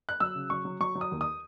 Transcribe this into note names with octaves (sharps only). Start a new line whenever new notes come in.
F#6
F#3 E6
C#3
F#3 C#6
F#3
F#3 C#6
F#3
D#6
D#2
D#6